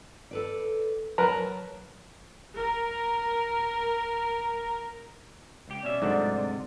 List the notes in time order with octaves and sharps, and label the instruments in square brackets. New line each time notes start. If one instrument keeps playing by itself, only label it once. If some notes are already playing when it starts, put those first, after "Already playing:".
[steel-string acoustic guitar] A4 B4 D5
[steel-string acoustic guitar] F#3 A5 [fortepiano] A#4 B4 A#5
[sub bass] D1 [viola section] A#4
[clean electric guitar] C#2 G4
[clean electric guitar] B2 C#4 E5 [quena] D5
[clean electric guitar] C2 F#3 A3 [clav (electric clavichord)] G#2 D3
[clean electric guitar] C3